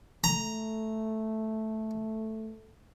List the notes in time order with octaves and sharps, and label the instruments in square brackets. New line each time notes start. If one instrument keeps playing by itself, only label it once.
[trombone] A3 [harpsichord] A#5